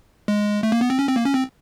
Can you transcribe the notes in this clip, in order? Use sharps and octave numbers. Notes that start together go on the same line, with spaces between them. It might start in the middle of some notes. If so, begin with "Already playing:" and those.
G#3
A3
A#3
B3
C4
C#4
C4
A#3
C#4
C4